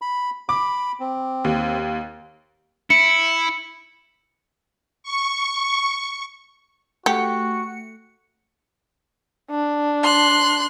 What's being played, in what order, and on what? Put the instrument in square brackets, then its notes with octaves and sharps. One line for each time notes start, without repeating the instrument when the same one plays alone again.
[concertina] B5
[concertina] B5 [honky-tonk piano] D6
[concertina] C4
[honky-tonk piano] D#2
[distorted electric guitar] E4 [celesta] C#7
[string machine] C#6
[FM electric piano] A3 C#7 [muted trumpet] F#4 [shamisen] G4 [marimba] F#5 G5
[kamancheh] D4
[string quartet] C6 F#6